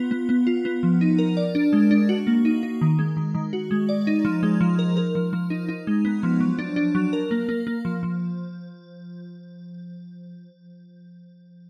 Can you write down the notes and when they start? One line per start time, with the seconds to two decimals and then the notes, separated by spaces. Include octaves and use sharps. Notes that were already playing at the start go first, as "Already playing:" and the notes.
Already playing: B3 F4
0.11 B3
0.29 B3
0.47 F4
0.65 B3
0.83 F3
1.01 D#4
1.19 A#4
1.37 D5
1.55 D4
1.73 G#3
1.91 D4
2.09 F#4
2.27 A#3
2.45 D#4
2.63 D#4
2.81 D#3
2.99 G#3
3.17 D#3
3.34 D#3
3.53 F#4
3.71 G#3
3.89 D5
4.07 D#4
4.25 F3
4.43 G#3
4.61 F3
4.79 A#4
4.97 A#4
5.15 F3
5.33 F3
5.50 D#4
5.69 D#4
5.87 G#3
6.05 B3
6.23 F3
6.41 F#3
6.59 D4
6.76 D4
6.95 F#3
7.13 A#4
7.31 A#3
7.49 A#3
7.67 A#3
7.85 F3
8.03 F3